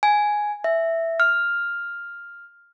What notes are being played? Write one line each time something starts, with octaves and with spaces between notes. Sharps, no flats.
G#5
E5
F6